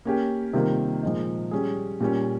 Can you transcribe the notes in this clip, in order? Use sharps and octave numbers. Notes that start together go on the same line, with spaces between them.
A#3 C#4 G4
C3 D#3 G3 A#3 F4
A#2 F3 G#3 D#4
G3 C#4 G#4
A#2 G3 C#4